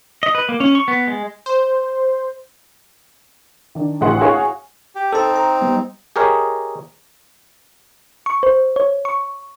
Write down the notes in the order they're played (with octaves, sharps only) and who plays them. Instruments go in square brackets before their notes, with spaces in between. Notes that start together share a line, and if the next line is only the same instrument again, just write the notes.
[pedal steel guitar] D#5
B4
A#3
C#4
C#6
B3
G#3
[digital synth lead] C5
[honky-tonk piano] D#3 D4
A1 D2 G#4 F#5 C6
F#4 G#4 C#5 F5 F#5 G#5
[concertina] G4
[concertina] C4 D#4 [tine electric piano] A4 A5
[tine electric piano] A#5
G3 B3
[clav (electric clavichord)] G4 G#4 A#4 C#5 D#5
[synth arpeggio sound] C#6
C5
C#5
C#6